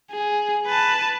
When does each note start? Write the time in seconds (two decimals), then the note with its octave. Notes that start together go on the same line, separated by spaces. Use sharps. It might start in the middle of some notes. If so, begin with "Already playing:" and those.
0.11 G#4
0.67 B4 A5